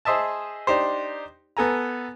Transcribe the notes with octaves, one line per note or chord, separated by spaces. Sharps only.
G#4 C5 D#5 E5 A5
D4 D#4 G4 C5
B3 A4 G#5 A#5